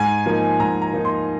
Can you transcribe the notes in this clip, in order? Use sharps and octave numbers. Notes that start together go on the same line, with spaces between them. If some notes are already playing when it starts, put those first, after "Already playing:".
Already playing: G#2 G#5
F3 A#3 D#4
G#2 A#5
A#5
F3 A#3 D#4
C6